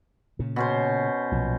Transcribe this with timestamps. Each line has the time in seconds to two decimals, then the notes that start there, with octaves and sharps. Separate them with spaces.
0.39 A#2 C#3
0.56 B2 C#4 C5
1.32 B1 A#2 F3